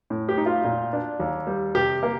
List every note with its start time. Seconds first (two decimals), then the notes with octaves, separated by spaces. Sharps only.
0.10 A2
0.29 G4
0.37 D#4
0.46 F4
0.64 A#2
0.93 D4
1.20 D#2
1.47 G3
1.75 C3 G4
2.03 A#3